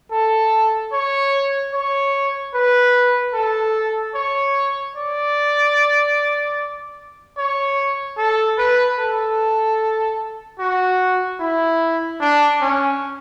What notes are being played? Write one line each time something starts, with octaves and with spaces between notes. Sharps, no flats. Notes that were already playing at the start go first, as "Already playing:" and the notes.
A4
C#5
C#5
B4
A4
C#5
D5
C#5
A4
B4
A4
F#4
E4
D4
C#4